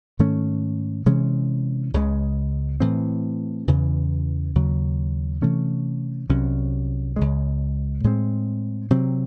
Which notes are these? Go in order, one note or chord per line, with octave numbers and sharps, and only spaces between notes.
G#2 D#3 A3 C#4
C3 E3 G#3 C#4
C#2 C#3 G#3
A2 E3 C4
E2 C#3 E3
D#2 C#3 F#3
C3 E3 A3 C#4
C2 C3 F#3 C#4
C#2 C#3 G#3
A2 G#3 C4
C3 F#3 C4